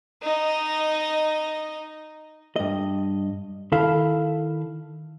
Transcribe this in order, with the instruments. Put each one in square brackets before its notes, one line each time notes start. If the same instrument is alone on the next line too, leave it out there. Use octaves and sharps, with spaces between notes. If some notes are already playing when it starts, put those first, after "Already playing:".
[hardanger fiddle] D#4 D#5
[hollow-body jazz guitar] G2 D#5
[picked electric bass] D#3 [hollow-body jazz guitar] E4 A4 F5